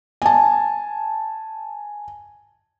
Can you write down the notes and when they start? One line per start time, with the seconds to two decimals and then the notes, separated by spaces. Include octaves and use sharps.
0.22 G#5 A5